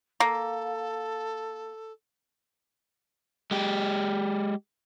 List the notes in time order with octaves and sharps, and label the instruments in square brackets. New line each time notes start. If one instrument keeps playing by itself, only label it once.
[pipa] A#3 [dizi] A4
[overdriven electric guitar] G#3 G4